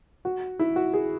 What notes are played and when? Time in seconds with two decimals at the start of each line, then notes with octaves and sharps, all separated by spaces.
0.25 F#4
0.59 E4
0.76 F#4
0.93 G#4